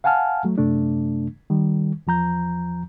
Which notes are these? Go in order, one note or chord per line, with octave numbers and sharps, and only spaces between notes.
F5 F#5 G#5 A5 F6
F#3 A3
F#2 C3 A3 D4
D#3 G3
E2 F3 A#5 G6